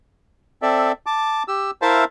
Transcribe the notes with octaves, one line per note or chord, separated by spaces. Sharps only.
C4 A4 D5 E5
A5 D6
G4 E6
E4 A#4 C5 E5 F5 A5